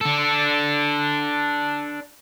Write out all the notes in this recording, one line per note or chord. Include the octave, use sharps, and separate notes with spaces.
D4 A4